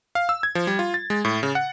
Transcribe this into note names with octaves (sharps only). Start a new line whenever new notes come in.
F5
E6
G#6
F3
G3
F4
A6
G#3
A2
C#3
F#5